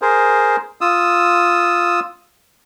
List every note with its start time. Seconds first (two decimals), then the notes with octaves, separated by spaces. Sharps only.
0.02 G#4 A#4 C5
0.81 F4 D#6 E6